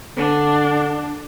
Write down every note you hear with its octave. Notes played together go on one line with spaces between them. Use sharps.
D3 D4